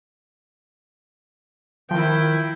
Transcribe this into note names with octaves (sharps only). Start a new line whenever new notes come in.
D#3 F3 E4 G5